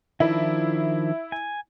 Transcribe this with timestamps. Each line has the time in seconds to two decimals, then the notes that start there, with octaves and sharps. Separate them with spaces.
0.20 D#3 F3 D4 E4
1.32 G#5